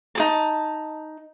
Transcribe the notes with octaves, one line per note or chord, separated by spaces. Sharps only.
D#4 G#4 A5